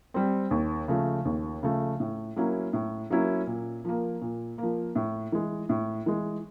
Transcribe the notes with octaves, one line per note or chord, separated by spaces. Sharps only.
G3 C4
D#2
C#3 F3 A3
D#2
C#3 F3 A3
A2
F#3 A#3 C#4 E4
A2
F#3 A#3 C#4 E4
A#2
F3 A#3
A#2
F3 A#3
A2
E3 G#3
A2
E3 G#3